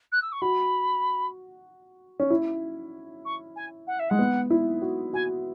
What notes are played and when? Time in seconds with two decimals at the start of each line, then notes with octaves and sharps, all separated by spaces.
0.12 F#6
0.22 E6
0.32 C#6
0.41 F#4 B5
2.20 C#4
2.30 E4
3.25 C#6
3.56 G#5
3.87 F#5
3.99 E5
4.10 G#3 F#5
4.19 B3
4.50 E4
4.82 F#4
5.13 F#4 G#5